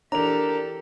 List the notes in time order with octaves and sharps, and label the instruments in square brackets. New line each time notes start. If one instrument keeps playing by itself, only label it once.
[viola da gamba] E3 G4 A4 [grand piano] D4 A#4 F7 [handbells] A#5